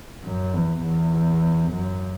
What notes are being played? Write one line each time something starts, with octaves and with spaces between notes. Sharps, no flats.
F#2
E2
E2
F#2